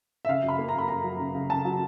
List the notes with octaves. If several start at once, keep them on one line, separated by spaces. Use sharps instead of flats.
E5
C#3 F5
F#2
B5
A#3
A#5
F#2 B5
F#2 A#5
F#3
C#3
C#3
C#3 A5
F#3